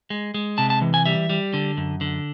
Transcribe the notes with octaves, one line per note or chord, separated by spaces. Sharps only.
G#3
G#3
C3 A5
A5
E3
G#5
G3 E5
G3
D3
F#2
D3